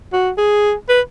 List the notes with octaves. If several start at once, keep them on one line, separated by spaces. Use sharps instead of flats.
F#4
G#4
B4